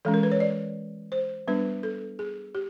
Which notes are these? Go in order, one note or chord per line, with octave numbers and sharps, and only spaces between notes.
E3 G#3 C#4 A4
A#4
B4
C#5
D5
C5
G3 B3 D4 B4
A4
G#4
G4